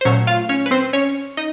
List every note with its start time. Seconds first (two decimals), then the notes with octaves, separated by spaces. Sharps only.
0.01 C5
0.05 A#2 F#3 A3 C#4 C#5
0.27 F4 F5
0.49 C#4 C#5
0.66 B4
0.71 C4 C5
0.93 C#4 C#5
1.37 D#4 D#5